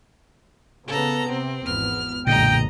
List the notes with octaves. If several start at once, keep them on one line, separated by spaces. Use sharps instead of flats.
C#3 B3 A4 A#5
C3 C4
G#1 E2 B3 F6
B1 F#2 A#2 D3 G#3 D#5 G5 A#5